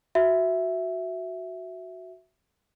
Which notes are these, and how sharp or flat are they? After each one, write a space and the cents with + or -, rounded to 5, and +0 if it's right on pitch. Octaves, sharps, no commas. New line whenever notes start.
F#4 +0 E5 +0